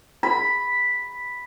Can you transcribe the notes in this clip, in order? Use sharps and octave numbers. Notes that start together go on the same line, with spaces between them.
B5